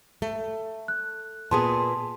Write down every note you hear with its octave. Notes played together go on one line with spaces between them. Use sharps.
A3
F#6
A#2 B3 G#4 A5 C6